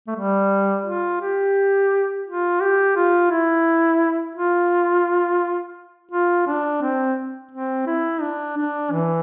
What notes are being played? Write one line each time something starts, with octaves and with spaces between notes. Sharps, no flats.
A3
G3
F4
G4
F4
G4
F4
E4
F4
F4
D4
C4
C4
E4
D4
D4
E3